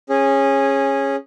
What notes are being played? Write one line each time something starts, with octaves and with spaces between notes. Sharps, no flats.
C#4 G#4